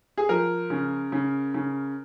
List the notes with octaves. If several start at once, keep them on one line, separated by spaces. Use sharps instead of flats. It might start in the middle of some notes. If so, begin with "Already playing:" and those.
G#4
F3 A#4
C#3
C#3
C#3